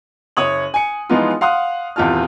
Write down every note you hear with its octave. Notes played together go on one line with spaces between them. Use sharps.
F#1 C#5 D#6 F#7
G#5 C#7
E3 F3 G#3 B3 D#4 F4
F5 F#5 C6 D#6 F#6
D#1 E2 C4 F4 A5 F6